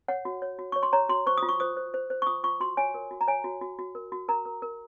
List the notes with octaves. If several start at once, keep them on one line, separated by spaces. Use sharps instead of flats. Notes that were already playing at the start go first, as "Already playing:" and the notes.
C#5 F#5
F#4
C#5
F#4
C#5 C#6
C6
C#5 A#5
F#4 C6
C5 C#6
F4 D#6
C#6
C5 D#6
C5
C5
C5
C#6
F4 D#6
F4 C#6
F#4 C6
C#5 G#5
A#4
F#4
A#5
C#5 G#5
F#4
F#4
F#4
A#4
F#4
A#4 A#5
A#4
A#4